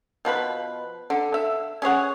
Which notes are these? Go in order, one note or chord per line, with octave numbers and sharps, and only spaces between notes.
B2 F3 B4 B5
D3
E5
C#4 G#4 C#5 F#5